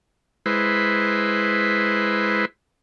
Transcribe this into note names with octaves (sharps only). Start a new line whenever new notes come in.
G#3 E4 B4 C5